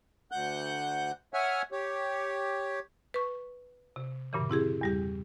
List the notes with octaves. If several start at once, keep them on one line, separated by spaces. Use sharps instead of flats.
D2 F#5 F#6 G6
C#5 E5 F#5 G#5 F6
G4 C#5
B4 C#6
C3
G2 A#2 C#3 E3
C4 E4 G4 G#4
E2 G3 G4